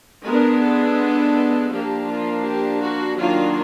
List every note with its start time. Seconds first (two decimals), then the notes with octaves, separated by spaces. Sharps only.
0.25 G#3 B3 D4 A#4
0.62 A4
1.71 F3 A#3 D4 G4
2.09 F4
2.44 G4
2.81 F#4
3.18 D#3 F#3 A#3 D4 F4